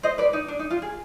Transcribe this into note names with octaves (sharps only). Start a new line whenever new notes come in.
C5 D#5
B4 D5
D#4
D4
D#4
F4
G#4